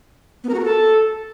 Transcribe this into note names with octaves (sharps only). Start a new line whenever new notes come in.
B3
A#4
F#4
A#4
A4